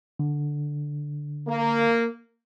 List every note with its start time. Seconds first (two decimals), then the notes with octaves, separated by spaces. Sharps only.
0.19 D3
1.48 A#3